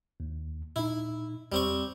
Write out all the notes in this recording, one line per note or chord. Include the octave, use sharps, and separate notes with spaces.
D#2
A#2 D#4 E4
E2 G3 C4 C#6